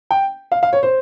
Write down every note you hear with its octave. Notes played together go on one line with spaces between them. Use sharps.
G5
F5
F5
C#5
C5